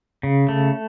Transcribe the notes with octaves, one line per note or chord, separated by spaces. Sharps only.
C#3
A3